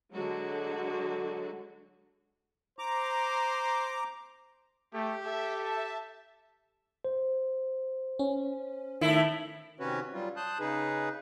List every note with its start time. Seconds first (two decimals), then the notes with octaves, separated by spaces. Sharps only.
0.13 D3 F#3 G#3 F#4
2.79 C5 A#5 D6
4.94 A3 G4
5.25 A4 E5
5.63 E5 A5
7.05 C5
8.19 C#4
9.01 A2 D#3 A3 E4
9.80 C3 D#3 C#4 F#4 B4 C#5
10.13 F#3 G3 F4
10.36 A5 C6 D#6 F#6 G6
10.59 C#3 D#4 G#4 B4